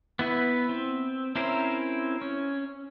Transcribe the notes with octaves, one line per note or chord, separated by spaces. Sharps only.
B3 E4 B4
C4
C4 C#4 E4 A#4 C5
C#4